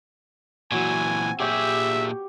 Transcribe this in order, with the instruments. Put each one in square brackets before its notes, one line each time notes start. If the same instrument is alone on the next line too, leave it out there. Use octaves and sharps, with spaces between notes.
[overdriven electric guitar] A#2 E3 [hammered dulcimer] F#3 F#4 [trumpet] G#5
[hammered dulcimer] C4
[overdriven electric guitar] A#2 G#4 [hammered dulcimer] G4 C#5 G5 [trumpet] E5